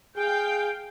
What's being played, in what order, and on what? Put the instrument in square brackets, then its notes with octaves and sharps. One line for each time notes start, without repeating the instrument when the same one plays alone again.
[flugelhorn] G#4 [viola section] F5 G5